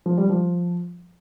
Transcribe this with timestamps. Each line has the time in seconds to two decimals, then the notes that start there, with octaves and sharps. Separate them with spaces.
0.06 F3
0.18 G3
0.29 F3